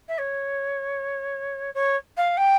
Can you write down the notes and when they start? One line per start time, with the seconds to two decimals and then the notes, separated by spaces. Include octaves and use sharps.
0.08 E5
0.18 C#5
1.74 C#5
2.17 F5
2.37 G5